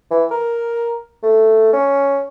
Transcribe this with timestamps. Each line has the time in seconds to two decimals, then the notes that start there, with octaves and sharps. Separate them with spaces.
0.11 E3
0.31 A#4
1.23 A3
1.73 C#4